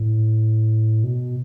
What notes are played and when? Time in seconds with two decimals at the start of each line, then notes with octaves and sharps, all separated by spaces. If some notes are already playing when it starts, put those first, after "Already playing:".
Already playing: A2
1.03 B2